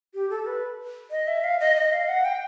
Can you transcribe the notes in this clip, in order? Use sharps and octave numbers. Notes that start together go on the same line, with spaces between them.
G4
A4
B4
D#5
E5
F5
D#5
D#5
F5
F#5
G5